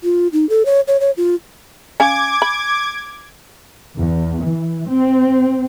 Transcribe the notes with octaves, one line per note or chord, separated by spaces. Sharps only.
F4
D#4
A4
C#5
C#5
C#5
F4
C#4 F5 G#5 D6 G#6
B5
E2
E3
C4